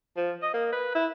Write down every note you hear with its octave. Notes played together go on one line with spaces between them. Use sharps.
F3
D#5
A#3
B4
E4